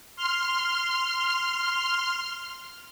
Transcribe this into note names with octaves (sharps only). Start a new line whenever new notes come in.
C6 F6